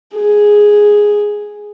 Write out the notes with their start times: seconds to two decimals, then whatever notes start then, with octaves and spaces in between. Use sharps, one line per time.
0.16 G#4